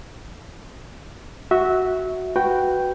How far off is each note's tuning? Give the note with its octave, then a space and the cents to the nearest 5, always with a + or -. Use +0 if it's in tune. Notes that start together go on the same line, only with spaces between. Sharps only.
F#4 +0 E5 -20
F#4 +0 B4 +0 G5 -5